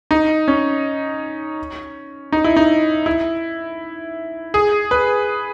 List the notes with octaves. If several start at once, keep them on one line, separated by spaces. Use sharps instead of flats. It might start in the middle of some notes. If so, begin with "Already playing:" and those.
D#4
C#4
D#4
E4
D#4
E4
G#4
B4